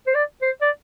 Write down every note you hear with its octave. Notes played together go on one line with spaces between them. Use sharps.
C5
D5
C5
D5